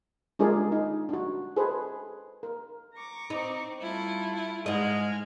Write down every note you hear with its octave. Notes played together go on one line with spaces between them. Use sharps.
G#3 D4 F4 G#4 A#4 D5
D#4
D4 F#4
G#4 A4 B4 C5
A#4
A#5 C#6 D6
C4 D#4
G3 A3 E4 F4
E4
G#2 G#3 G#4 D#5 F6